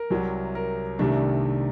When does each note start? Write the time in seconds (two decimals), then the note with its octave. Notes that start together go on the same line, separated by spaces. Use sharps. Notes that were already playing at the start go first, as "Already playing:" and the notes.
Already playing: A#4
0.10 C2 C3 F#3
0.55 A#4
0.99 C2 C3 D#3 A3 D4